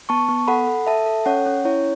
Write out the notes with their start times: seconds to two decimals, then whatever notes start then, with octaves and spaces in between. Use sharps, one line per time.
0.09 B3 A5 C#6
0.29 B3
0.47 A4 F#5 B5
0.67 A4
0.87 A4 E5 A5
1.06 A4
1.26 C#4 C#5 F#5
1.46 C#4
1.65 E4 C#5